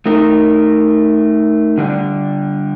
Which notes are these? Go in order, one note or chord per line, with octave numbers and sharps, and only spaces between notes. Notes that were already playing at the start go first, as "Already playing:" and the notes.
A3 D#4 A#4
D3 G3 D4